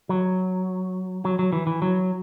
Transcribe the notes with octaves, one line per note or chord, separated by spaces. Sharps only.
F#3
F#3
F#3
E3
E3
F#3